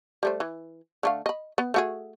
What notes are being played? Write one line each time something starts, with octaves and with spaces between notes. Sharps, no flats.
G3 A3 C5
E3
D3 A3 F5
D#5 B5
B3
A3 F#4 G#4